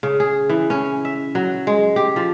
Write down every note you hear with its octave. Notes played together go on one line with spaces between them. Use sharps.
C#3
G#4
E3
C#4
E5
F#3
G#3
G4
F3